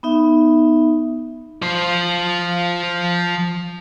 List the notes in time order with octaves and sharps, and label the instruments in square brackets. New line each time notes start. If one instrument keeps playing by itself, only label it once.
[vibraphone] B3 D#4 E5
[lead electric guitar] F3 C5